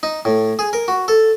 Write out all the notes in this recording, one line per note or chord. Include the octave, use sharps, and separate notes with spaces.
D#4
A2
G#4
A#4
F#4
A4